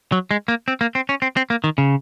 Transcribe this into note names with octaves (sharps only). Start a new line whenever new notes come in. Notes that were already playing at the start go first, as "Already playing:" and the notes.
F#3
G#3
A#3
C4
A#3
C4
C#4
C4
C4
A#3
D#3
C#3